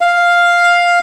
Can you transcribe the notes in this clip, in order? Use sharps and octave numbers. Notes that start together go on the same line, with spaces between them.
F5